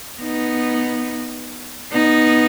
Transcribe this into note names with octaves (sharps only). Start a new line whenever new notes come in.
B3 D#4
B3 D#4